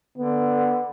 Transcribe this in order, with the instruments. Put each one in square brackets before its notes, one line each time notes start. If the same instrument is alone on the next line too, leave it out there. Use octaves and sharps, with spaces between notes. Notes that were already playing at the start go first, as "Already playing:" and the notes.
[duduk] D3 [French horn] B3